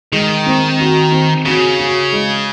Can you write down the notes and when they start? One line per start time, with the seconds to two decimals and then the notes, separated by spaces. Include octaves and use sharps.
0.13 D#3 G#3
0.46 C4
0.80 F#4
1.12 C4
1.45 C#3 F#4
1.79 F#4
2.13 G#3